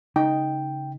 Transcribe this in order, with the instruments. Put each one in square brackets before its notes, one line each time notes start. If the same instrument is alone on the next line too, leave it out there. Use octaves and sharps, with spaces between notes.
[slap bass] C#3 [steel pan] D#4 [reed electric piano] G5